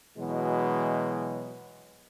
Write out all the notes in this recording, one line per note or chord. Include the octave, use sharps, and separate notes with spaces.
B2 E3 F#3 G#3